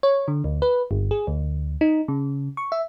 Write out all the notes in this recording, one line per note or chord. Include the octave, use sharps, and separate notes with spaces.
C#5
D3
D2
B4
G1
G#4
D2
D#4
C#3
C#6
E5